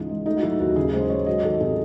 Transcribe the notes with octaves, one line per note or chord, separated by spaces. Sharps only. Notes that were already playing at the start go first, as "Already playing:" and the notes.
Already playing: C#2 G#2 E3 D#4
G#3
A3 D#4
F#4
F#3 E4
D#2 F#4
C#3 G#4
G#3 C5
G#3 C#5
F#3 D#5
D#3 A4
C3 G#4